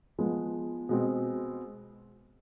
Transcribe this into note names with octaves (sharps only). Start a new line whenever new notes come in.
F3 G#3 B3
B2 G#3 C4